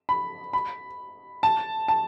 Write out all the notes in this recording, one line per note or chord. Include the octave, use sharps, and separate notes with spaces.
B5
B5
A5
A5